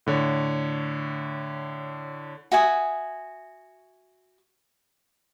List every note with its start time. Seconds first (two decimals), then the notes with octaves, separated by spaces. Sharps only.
0.07 A2 D3 C#5
2.52 F#4 E5 G#5 D#6